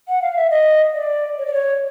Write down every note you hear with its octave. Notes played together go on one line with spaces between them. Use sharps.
F#5
F5
E5
D#5
D5
C#5
D5
C#5